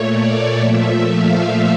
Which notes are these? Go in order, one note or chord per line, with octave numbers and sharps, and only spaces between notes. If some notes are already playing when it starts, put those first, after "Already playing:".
Already playing: A#2 A3 C#5
D5
A#2 F3 A3 E5
F5